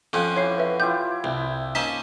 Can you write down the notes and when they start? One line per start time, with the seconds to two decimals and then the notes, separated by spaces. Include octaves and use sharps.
0.13 F2 C#4 F#4 C5 F5
0.36 E3 C#5 C7
0.58 B4 E5
0.80 E4 F4 G4 G6
1.24 C2
1.75 A#3 C#4 D#4 C5 A5 B6